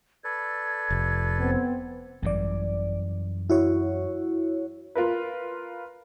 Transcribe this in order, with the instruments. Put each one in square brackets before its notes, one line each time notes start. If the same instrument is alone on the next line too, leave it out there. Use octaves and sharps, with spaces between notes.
[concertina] A4 B4 D5 [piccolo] G#6
[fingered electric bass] F1
[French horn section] B3 C4
[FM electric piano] G#1 D5 [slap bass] F#2 E3 G3
[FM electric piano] E4 F#4 C#5
[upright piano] F4 A#4 B4